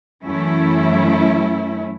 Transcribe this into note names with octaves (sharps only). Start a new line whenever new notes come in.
F#2 E3 A3 C#4 E4